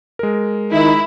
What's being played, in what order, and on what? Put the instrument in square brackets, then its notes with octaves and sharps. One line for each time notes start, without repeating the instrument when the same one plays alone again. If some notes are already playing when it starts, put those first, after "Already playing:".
[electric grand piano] G#3 A#4
[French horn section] D#3 D#4 [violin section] E4